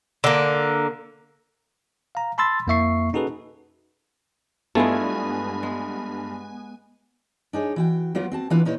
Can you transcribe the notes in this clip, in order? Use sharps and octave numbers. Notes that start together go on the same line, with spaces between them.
D3 A#3
F5 A#5
A5 B5 C6 E6 A6
F2 A#3 E4 E5 C#6 C7
C#4 D#4 F#4 G#4 A4 B4
G2 G#3 A3 B3 E4 F4 G#5
G#3
D4 D#4 G#4 C#5
E3 F#4 G5
F#3 A#3 B3 F4 F#4
C4 F#4 A5
E3 B3 D4 E4 F4 B4
A#2 D#4 E4 B4 C#5